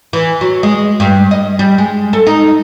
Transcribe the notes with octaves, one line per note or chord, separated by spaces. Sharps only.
E3
F#3
G#3
G2
D#5
G3
G#3
A4
D#4